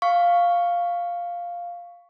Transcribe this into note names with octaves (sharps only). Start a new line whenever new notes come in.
F5 C#6